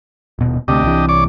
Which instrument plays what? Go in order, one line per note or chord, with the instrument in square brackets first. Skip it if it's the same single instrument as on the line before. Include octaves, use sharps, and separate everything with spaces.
[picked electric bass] D#1 B2
[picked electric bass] D2 C3 [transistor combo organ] D4 G4 D#5
[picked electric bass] C2 C3 E3
[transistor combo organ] C#5 D5 D6